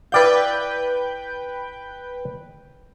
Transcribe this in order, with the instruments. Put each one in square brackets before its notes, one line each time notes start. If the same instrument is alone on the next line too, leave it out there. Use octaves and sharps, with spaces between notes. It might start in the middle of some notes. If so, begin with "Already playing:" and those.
[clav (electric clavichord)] E4 D5 F5 [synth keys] B4 G5 G6